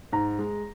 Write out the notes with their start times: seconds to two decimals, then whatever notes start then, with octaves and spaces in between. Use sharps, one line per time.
0.12 G#2 A#5
0.39 G#3